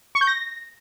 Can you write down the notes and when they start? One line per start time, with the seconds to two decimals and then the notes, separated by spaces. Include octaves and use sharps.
0.15 C#6
0.21 G6
0.27 A#6